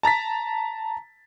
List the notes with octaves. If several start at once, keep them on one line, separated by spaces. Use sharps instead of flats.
A5 A#5 A6 B6